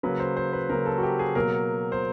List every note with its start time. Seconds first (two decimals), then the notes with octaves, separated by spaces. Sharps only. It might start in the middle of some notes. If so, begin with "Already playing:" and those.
0.03 C#3 F#3 A#3 B4
0.20 C5
0.37 C5
0.53 B4
0.69 C#3 F#3 A#3 A#4
0.86 A4
0.98 F#4
1.03 G4
1.19 G#4
1.35 B2 F#3 A#3 A#4
1.92 C5